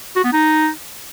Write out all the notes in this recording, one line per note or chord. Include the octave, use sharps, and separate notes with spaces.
F#4
B3
D#4